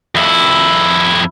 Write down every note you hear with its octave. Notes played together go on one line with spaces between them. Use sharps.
F2 E4